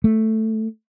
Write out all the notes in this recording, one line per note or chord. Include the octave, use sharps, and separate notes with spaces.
A3